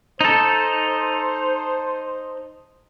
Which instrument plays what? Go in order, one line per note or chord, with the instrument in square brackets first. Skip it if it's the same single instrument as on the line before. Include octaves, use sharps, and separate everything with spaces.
[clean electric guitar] D#4 A4 [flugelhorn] C5